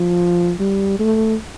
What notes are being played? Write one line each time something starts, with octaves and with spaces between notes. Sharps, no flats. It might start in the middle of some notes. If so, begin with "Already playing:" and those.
Already playing: F3
G3
A3